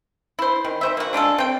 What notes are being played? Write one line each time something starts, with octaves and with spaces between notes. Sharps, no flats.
E4 C5
D#3
D#3 C5 E5
A#3 F#4
G#3 D4 F4 A4
C4 G5